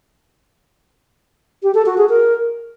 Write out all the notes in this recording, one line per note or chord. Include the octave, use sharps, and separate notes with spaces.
G4
A4
F#4
G#4
A#4